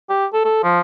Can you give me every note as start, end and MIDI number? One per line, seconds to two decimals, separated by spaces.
0.09 0.26 67
0.33 0.44 69
0.45 0.63 69
0.63 0.81 53